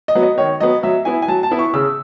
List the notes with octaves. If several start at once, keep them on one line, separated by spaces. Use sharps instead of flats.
D#5
F#3 B3
D#5
D#3 C#5
F#3 B3 D#5
F#3 E5
B3 E4 G#5
G#5
F#3 A5
A5
B3 E4
C#6
C#3 E6